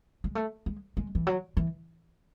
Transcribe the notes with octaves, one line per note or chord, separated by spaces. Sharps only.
G#3
A3
G#3
G#3
E3
F#3
E3